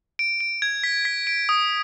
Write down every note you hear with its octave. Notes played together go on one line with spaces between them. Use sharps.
D7
D7
G#6
B6
B6
D7
D#6